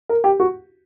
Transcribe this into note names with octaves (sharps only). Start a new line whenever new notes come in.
A#4
G4
F#4